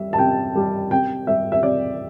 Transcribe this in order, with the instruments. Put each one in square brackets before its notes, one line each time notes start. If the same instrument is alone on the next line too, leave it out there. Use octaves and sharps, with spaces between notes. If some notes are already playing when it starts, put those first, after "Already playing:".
Already playing: [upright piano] G3 E5
A5
C3 G5
G3
C3 G5
G3 E5
E5
C3 D5